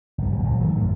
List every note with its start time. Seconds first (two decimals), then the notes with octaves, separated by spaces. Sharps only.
0.18 G1 G3
0.30 F#1
0.43 A#1 F#3
0.59 D#3 F#3 G3 A3
0.75 G#1 F#2 D#3 A3